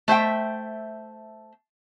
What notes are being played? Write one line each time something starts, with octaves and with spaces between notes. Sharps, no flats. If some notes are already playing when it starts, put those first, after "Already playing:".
A3 C5 E5 G5